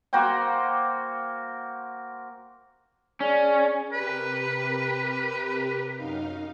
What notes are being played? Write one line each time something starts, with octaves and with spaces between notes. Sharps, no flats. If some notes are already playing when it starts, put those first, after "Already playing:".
A#3 F#4 C5 G5
C#4 G#4 D5
C3 G4 A#4 B4
F#2 D#4 F5